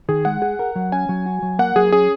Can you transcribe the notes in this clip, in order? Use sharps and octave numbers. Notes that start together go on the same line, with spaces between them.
D#3 G#4
G#3 F#5
G#4
A#4
F#3
C#4 G#5
F#3
F#4
F#3
A#3 F#5
F#3 G#4
C#4 G#4